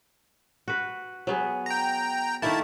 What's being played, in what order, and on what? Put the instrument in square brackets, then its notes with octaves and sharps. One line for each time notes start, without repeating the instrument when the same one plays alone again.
[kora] F#4 B4
F#3 B3 G#4
[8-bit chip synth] G5 A#5
[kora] D#3 A3 A#3 [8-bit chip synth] E4 A5